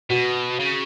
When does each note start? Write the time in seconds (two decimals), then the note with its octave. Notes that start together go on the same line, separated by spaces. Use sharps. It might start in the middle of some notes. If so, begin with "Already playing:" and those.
0.10 B2 F#4
0.60 C#3